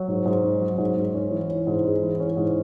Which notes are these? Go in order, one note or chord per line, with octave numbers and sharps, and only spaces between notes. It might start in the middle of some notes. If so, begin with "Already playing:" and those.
Already playing: F#3
G#2
G#2
C#4
F#3
G#2
G#2
C#4
E3
C#4
G#2
G#3
E3
C#4
G#2